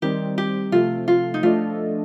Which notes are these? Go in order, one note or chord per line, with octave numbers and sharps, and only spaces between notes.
D#3 G3 C4 G4
G4
C3 F3 A3 F4
F4
D#4
F3 A3 D4 F4 A4 D#5